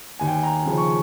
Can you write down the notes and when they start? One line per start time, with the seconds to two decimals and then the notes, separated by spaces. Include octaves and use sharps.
0.19 D#2 G#5
0.27 G5
0.36 G#5
0.43 A#5
0.66 C#3 F3
0.77 C#6